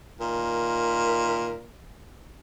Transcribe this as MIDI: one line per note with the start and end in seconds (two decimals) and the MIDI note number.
0.20 1.66 46
0.20 1.66 51
0.20 1.66 70